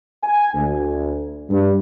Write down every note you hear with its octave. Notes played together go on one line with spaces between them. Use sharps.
G#5
D2
G2